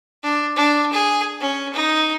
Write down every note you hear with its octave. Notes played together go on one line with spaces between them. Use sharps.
D4
D4
G#4
C#4
D#4